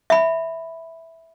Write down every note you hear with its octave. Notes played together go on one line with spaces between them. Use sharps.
E5 B5